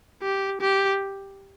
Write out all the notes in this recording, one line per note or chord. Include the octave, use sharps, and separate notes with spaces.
G4
G4